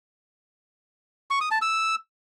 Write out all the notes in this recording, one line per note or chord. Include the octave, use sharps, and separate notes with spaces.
C#6
D#6
A5
E6